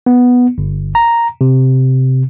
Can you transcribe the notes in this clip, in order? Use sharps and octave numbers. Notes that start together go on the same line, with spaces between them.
B3
G1
A#5
C3